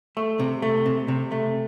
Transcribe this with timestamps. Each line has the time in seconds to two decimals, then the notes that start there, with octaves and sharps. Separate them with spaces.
0.17 A3
0.40 C3
0.62 A3
0.86 C3
1.08 C3
1.32 A3